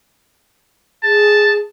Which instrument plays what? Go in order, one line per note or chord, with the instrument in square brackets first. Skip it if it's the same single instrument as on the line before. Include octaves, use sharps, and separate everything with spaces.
[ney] G#4 [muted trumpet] A5